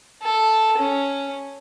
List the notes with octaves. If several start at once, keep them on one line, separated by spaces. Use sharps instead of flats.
A4
C#4